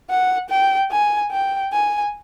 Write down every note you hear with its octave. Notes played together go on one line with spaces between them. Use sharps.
F#5
G5
G#5
G5
G#5